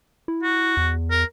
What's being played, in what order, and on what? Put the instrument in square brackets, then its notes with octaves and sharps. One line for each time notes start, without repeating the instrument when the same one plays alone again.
[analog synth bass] E4
[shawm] F#4
[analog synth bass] E2
[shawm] A#4